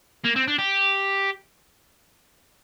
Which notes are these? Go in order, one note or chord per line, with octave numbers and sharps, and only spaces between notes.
A#3
C4
D4
G4